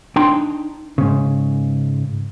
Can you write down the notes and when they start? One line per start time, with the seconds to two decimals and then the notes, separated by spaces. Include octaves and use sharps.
0.16 D4 D#4 G5 A#5 C6
0.98 G#2 C#3